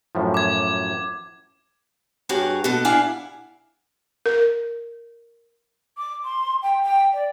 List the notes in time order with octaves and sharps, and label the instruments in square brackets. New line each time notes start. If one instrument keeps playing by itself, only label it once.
[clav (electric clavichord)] F#2 A2 F3
[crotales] D6 G#6
[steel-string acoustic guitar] G2 F#4 G#4 C#5 F5
B2 A#3 A4 F#5
A#3 D4 E4 F5 F#5 G#5
[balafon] A#4
[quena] D6
C6
G5
G5
D5